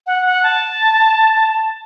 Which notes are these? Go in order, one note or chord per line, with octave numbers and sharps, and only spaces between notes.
F#5
F#5
A5